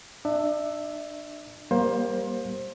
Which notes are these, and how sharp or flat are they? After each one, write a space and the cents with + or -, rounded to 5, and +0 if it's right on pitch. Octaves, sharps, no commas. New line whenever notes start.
D4 +30 E5 +0
G3 -5 A#3 +25 C5 +25